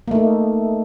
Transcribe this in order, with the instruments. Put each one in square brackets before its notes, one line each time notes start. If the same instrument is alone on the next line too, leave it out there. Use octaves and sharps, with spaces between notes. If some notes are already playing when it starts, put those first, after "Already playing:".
[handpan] A#3
A3
D#4